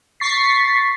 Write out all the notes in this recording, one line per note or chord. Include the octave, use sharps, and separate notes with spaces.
C#6 A6 B6 C7